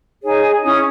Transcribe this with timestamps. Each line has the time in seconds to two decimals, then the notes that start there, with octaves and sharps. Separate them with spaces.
0.23 D#4 G#4 C#5
0.64 C#4 E4 D#6